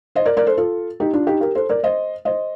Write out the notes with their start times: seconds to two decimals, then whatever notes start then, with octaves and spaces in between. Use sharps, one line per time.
0.15 C5 D#5
0.25 A#4 D5
0.37 A#4 D5
0.46 A4 C5
0.57 F4 A4
1.00 D#4 G4
1.13 D4 F4
1.27 D#4 G4
1.41 G4 A#4
1.55 A4 C5
1.69 A#4 D5
1.83 C5 D#5
2.25 C5 D#5